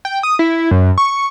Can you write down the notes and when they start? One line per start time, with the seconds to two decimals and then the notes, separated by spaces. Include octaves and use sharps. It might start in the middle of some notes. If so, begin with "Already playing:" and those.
0.05 G5
0.23 D#6
0.39 E4
0.71 F#2
0.98 C#6